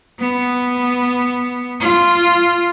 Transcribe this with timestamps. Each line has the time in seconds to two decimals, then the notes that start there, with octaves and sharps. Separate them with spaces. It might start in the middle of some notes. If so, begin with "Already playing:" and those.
0.19 B3
1.80 F4